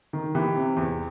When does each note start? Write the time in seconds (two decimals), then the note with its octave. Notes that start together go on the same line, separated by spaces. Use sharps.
0.13 D#3
0.35 E3 G4
0.55 C3
0.77 E2